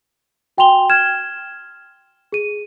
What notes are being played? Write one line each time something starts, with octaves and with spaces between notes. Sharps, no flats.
F#4 G5 G#5 C6 F7 G7
F6 G#6 E7
G#4 D#7